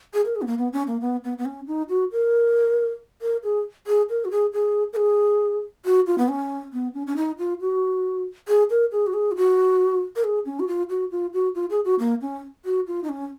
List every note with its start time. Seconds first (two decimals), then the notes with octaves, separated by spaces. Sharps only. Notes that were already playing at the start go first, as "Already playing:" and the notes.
0.14 G#4
0.25 A#4
0.36 G#4
0.42 B3
0.47 A#3
0.58 B3
0.73 C#4
0.87 A#3
1.01 B3
1.24 B3
1.38 B3
1.45 C#4
1.67 D#4
1.89 F#4
2.12 A#4
3.22 A#4
3.44 G#4
3.87 G#4
4.10 A#4
4.25 F#4
4.31 G#4
4.53 G#4
4.93 A#4
4.96 G#4
5.85 F#4
6.07 F4
6.18 B3
6.29 C#4
6.73 B3
6.94 C#4
7.07 C#4
7.16 D#4
7.38 F4
7.61 F#4
8.48 G#4
8.70 A#4
8.92 G#4
9.07 F#4
9.14 G#4
9.31 F4
9.36 F#4
10.16 A#4
10.24 G#4
10.46 C#4
10.60 F#4
10.68 F4
10.90 F#4
11.11 F4
11.33 F#4
11.55 F4
11.70 G#4
11.85 F#4
11.99 A#3
12.21 C#4
12.65 F#4
12.87 F4
13.04 D#4
13.09 C#4